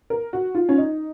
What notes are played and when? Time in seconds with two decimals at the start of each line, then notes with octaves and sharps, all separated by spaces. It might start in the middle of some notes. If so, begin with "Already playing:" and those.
0.10 A#4
0.33 F#4
0.55 F4
0.69 C#4
0.78 D#4